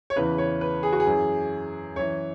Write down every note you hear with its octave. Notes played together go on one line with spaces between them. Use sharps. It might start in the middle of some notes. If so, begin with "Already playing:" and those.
C#5
E2 C#3 E3 B4
C#5
B4
G#4
F#4
G#4
F#2 E3
F#2 E3 C#5